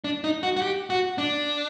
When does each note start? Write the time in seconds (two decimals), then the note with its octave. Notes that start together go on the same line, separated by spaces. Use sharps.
0.04 D4
0.24 D#4
0.43 F#4
0.56 F#4
0.62 G4
0.90 F#4
1.18 D4